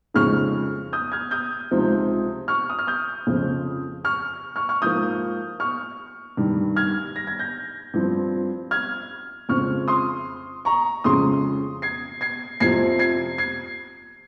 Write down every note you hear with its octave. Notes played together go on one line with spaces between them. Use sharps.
F2 C#3 G#3 D#4 C#6 F6
D#6 G6
F6 G#6
D#6 G6
C#2 C3 F3 C4 D#4
C#6 F6
D#6
F6
D#6 G6
F2 C#3 F3 C4
C#6 F6
C#6 F6
C#6 F6
G#2 F3 A#3 D#6 G6
C#6 F6
G2 D#3 G3
F6 G#6
A#6
G#6
G6 A#6
G2 F3 C4
F6 G#6
F2 C#3 F3 G#3 C4 C#6 F6
C6 D#6
A#5 C#6
F2 C#3 G#3 C#4 C6 D#6
G#6 C7
G#6 C7
F2 C3 F3 G#6 C7
G#6 C7
G#6 C7